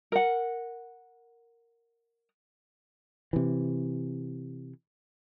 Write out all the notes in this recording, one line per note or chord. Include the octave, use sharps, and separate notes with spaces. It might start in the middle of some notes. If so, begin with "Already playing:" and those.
A#4 F#5
C3 E3